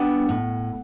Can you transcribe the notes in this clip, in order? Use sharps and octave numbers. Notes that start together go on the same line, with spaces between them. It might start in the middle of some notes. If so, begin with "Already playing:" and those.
Already playing: G3 B3 D4 F#5
A2